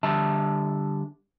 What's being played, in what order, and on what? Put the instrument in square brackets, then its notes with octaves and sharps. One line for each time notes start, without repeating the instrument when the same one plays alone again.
[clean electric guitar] D3 G3 E5 A5